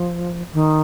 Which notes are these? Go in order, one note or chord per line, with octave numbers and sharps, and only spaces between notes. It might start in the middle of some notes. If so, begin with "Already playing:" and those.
Already playing: F3
D#3